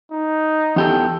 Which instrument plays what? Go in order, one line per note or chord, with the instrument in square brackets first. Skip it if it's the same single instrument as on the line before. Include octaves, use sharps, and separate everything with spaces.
[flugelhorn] D#4
[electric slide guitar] E2 G4 A4